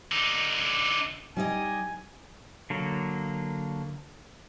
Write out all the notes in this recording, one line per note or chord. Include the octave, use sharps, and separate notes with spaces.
D3 D#4
G3 D#4 D#5 G#5
D3 F#3 A#3